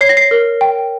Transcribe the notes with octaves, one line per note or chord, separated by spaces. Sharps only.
C#5 C7
A#6
C7
A#4
G5